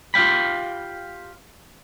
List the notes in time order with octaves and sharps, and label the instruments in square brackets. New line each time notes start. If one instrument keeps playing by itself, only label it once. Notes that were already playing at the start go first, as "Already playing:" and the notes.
[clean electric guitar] F4 G4 F5 G5 B5